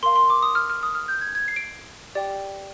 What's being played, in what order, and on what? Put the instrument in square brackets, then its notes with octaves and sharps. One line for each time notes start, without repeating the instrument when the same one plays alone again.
[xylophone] A#4 F5 C6
C6
D6
D#6
F6
F6
D#6
F6
G6
G#6
G#6
C7
D7
C7
G4 D5 G5